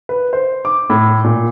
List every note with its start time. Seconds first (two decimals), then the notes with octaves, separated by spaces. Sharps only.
0.09 B4
0.33 C5
0.65 D6
0.90 A2
1.24 A#2